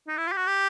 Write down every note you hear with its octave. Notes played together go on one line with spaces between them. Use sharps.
D#4
E4
F4
G4
F#4
G4